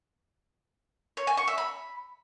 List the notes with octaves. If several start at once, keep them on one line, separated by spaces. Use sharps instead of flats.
C#5
G#5
C#6
E5
B5